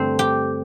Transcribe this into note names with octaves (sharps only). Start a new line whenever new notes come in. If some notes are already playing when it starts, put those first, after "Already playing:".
Already playing: G2 D3 A3 C4 A4 C5
G4 G5